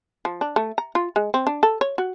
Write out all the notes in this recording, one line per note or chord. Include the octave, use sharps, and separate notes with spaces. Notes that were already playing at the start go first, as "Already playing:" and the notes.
F3
D4
A3
A#5
F4
G#3
C4
D4
A4
C#5
F#4